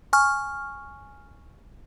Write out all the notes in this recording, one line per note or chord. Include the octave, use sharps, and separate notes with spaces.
G#5 C#6 F6